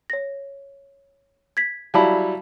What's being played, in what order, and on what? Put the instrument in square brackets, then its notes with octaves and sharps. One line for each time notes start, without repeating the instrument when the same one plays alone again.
[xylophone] C#5 A#6
G#6 B6
[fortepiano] F#3 G3 E4 [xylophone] F5 A5 B5